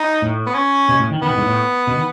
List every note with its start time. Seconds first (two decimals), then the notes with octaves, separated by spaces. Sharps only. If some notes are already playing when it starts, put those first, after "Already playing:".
Already playing: D#4
0.22 A2
0.46 B3
0.55 C#4
0.89 B2
0.99 A2
1.11 D#3
1.22 D#3 B3
1.30 B2
1.38 G#2
1.46 A2
1.87 B2
1.96 D#3